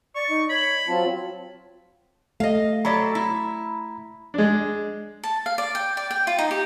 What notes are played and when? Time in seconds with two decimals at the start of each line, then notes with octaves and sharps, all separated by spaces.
0.15 D5 C#6
0.29 D#4
0.49 C#5 B5
0.88 F#3 C4 F4 A5
2.40 A3 D#5 F5
2.85 F#3 A4 D5 A#5 B5 B6
3.15 E4
4.34 G#3 D4
5.23 A5
5.46 F5
5.58 D5
5.75 G5
5.97 D5
6.11 G5
6.27 F4
6.39 D#4
6.51 G4